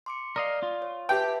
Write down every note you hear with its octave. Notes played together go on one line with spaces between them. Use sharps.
C6 D6 C#7
A#4 D5 D#5 F5
F4
C#5
G4 B4 E5 G5 A5